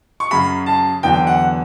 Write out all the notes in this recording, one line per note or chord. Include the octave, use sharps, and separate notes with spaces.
C#6
F#2 C#3 F#3 B5
A5
E2 D3 F#3 G5
F#5